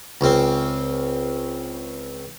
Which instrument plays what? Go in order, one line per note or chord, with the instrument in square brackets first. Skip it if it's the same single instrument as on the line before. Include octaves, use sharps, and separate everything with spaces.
[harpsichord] C#2 C4